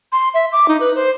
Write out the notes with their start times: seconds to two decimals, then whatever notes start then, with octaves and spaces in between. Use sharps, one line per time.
0.12 C6
0.34 E5
0.52 D6
0.68 D#4
0.80 B4
0.95 C5